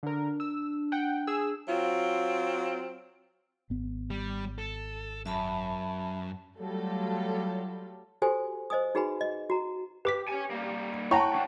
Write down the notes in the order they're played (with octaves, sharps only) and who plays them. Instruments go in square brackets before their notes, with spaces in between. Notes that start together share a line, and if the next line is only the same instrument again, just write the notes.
[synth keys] D3 A#4 [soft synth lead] D4
[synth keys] E6
F#5 G5
G#4 E6
[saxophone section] F#3 C4 F4
[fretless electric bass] G#1 B3
[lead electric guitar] G3
A4
[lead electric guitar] F#2 [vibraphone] E5 A5 B5
[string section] F#3 G3 A3 F4 A4
[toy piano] F#4 G4 A4 C5 G#5
C5 D#5 G#5 D#6
D#4 F#4 G#4 B4 G#5 B5
D#5
F#4 A#5
[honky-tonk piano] G4 [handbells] B4 D6 B6
[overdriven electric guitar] C#5 G#5
G3 A#3
[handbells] E4 A#5 A#6 [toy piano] C#5 A5 [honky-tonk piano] F#5 G5 C#6
[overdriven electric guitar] D2 D4